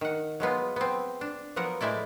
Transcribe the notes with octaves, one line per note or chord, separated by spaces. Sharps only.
D#3 F#5
F#3 G#3 B3 F4
B3 C4
D4
F3 F#3 B3 A#4 F#5
A2 G#3 A3 E4 D5